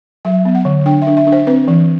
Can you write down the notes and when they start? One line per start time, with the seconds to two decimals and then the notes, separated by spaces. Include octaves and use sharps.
0.25 F#3 E5
0.45 B3
0.55 F#5
0.65 D3
0.86 D4 G5
1.02 E5
1.07 D4
1.17 E5
1.27 D4
1.32 C5
1.47 C4 B4
1.68 E3